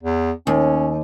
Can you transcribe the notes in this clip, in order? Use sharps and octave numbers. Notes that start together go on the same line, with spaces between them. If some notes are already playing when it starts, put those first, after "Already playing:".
E2
D#2 C#4